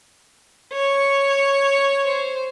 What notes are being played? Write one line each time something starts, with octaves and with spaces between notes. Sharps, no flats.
C#5
C5